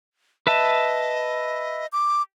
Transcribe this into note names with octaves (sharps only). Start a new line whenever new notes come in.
B4 D#5 E5 A5
D6